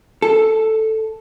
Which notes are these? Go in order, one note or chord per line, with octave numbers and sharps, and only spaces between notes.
A4